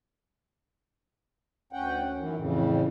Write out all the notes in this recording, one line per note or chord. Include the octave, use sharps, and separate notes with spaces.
D2 C#4 F#5 G5
F#2 D#3 E3
F2 A2 C#3 E3